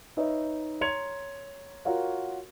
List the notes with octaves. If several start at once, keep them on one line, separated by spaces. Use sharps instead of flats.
D#4 B4 C#5 D#5 E5
C#5 A#5 C6 G#6 C#7 F7
F4 F#4 A#4 C#5 F5